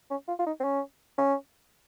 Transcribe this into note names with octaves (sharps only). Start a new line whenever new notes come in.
C#4
F4
F4
D#4
C4
C#4
C#4